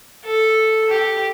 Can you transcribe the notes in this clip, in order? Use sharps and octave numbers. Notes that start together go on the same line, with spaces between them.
A4
G4